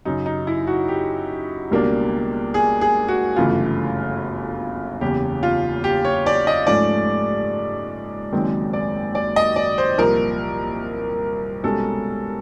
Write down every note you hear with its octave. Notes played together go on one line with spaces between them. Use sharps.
F#2 C#3 F#3 D#4
D#4
E4
F#4
G4
C#2 B2 G3 A#3 D4
G#4
G#4
F#4
G1 F#2 C#3 E3 A3 F4
F#1 E2 C#3 G4
F4
G4
C#5
D5
D#5
G#2 F3 A3 C#4 D5
F#1 F#2 D#3 G#3 C4
D5
D5
D#5
D5
C5
C2 A#2 F3 A#4
C2 B2 G#3 C#4 A4